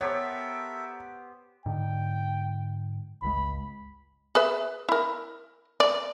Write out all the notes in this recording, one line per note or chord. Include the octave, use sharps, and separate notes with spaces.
B3 G4 A4 A#4 C5 C#5 E5
G#2 D3 G5
G1 C#2 G#3 B5
G#4 B4 E5
E4 A#4
D5